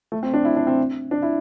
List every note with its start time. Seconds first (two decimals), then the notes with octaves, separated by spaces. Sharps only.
0.12 A3
0.23 C4
0.34 D4
0.45 E4
0.56 D4
0.67 C4
1.11 D4
1.22 E4